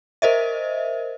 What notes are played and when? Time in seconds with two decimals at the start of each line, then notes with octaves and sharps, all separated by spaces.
0.22 A#4 C5 D#5 E5